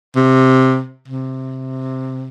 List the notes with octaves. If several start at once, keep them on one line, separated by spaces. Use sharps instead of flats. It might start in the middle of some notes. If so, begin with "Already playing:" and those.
C3
C3